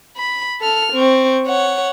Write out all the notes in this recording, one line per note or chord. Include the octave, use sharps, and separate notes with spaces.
B5
A4 F6
C4 C#6
C#5 F#5